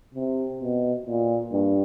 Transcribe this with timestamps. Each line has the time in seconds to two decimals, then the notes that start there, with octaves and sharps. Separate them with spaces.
0.15 C3
0.60 B2
1.06 A#2
1.52 G2